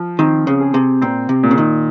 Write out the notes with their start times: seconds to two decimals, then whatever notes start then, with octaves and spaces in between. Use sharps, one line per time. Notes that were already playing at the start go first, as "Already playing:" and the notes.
Already playing: F3
0.19 D#3 C4
0.47 C#3
0.60 G#4
0.74 C3
1.02 A#2 C4
1.29 C3
1.43 A#2
1.51 C#3
1.58 D#3